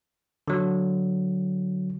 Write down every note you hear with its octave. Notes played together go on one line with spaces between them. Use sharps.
D3 F#3